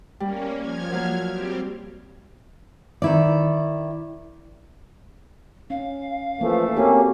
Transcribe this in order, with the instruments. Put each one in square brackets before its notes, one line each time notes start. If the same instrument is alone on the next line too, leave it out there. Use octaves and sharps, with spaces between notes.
[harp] G3 [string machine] A#3 C#4
[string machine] F3 F6 G#6
[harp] F#3 A#3
[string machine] G3 C4 G4
[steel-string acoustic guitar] D#3 E4 D5
[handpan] C#4 [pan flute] F5
[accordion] E3 F3 [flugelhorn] A3 [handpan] A#3 A4
[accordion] A#3 C#4 [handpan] C4 F#4 G4